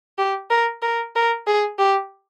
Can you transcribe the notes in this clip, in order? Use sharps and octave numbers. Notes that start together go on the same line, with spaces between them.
G4
A#4
A#4
A#4
G#4
G4